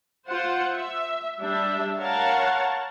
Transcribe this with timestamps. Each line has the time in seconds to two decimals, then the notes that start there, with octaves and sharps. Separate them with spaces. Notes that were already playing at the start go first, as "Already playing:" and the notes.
0.28 F4 C5 F#5
0.75 E5
1.40 G3 D4 E5
1.99 A#4 C#5 F5 F#5 A5